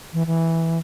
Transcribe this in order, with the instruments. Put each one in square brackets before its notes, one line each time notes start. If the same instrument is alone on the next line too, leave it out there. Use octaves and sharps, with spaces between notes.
[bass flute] E3
E3